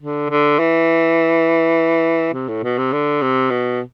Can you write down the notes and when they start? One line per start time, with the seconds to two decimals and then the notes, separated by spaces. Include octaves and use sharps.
0.01 D3
0.30 D3
0.59 E3
2.34 C3
2.49 A2
2.63 B2
2.78 C3
2.93 D3
3.22 C3
3.50 B2